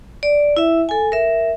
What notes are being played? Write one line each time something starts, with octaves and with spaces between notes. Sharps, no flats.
D5
E4 E5
A4 G#5
A#4 E5